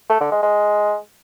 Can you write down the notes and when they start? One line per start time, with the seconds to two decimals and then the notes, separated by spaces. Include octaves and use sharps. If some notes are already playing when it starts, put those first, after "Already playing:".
0.10 A3
0.21 D3
0.32 G#3
0.43 G#3